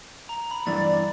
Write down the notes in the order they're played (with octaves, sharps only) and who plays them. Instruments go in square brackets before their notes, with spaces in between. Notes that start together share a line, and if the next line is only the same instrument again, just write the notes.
[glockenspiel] A#5
B5
[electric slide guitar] E2 G2 E3 [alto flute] D5 [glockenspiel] A6